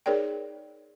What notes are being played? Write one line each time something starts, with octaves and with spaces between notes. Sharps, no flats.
D#4 G#4 A#4 C#5 D5 G5